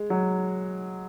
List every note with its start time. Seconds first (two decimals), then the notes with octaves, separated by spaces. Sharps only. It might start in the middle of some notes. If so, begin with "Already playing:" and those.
Already playing: G#3
0.10 F#3